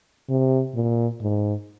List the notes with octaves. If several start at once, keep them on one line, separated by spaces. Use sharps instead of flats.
C3
A#2
G#2